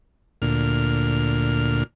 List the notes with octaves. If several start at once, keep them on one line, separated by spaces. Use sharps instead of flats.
D2 A#2 F6